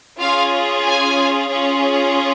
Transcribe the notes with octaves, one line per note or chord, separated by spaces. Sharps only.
C#4 F4 G#4 F5
G#5
C#4 F4 G#4